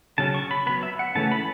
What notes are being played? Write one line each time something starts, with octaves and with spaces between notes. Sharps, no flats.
C#3 F#3 C#4 A5
C#6
B5
F#3 B3 B5
E5
F#5
C#3 E3 A3 C#4 A5
B5